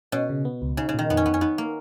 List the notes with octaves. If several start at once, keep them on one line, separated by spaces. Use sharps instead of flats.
B2 C#4
C#3
B3
C#2
C#3 D#4
C#3
A#2 D#3
F2 B3
C#4
F2 B3
C#4
B3 D#4
A#3